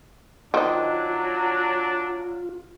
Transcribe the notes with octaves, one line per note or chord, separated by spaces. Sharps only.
D#3 F#3 D4 F4 C5 D#5